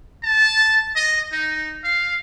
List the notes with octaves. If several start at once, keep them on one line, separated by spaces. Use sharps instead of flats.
A5
D#5
D#4
F5